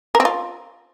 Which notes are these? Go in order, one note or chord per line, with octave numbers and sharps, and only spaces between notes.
A#4
C4
F4